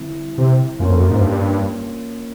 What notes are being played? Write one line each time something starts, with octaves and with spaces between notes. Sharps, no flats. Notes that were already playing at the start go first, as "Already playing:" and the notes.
Already playing: D3 G3 C4 E4
C3
F#2 A#3 C#4 F4
F2
F#2
G#2
G2